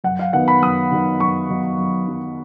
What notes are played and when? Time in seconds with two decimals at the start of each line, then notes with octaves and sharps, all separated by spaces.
0.04 F#2 F#5
0.19 F5
0.33 D#3 F#3 B3 D#4 F#5
0.48 B5
0.62 F#2 D#6
0.91 D#3 F#3 B3 D#4
1.20 F#2 C#6
1.49 D#3 F#3 B3 D#4
1.78 F#2
2.08 D#3 F#3 B3 D#4